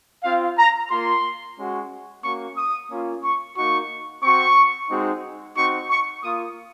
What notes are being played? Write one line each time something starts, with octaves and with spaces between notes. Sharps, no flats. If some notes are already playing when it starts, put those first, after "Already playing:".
C4 F4 F5
A#5
A#3 F4 C6
G#3 C#4 F#4
A#3 C#4 F#4 C#6
D#6
A#3 C#4 F4
C#6
A#3 D#4 F#4 C#6
C4 F#4 C#6
G#3 C4 D#4 F#4
C4 D#4 F#4 C#6
C#6
A#3 F4 D#6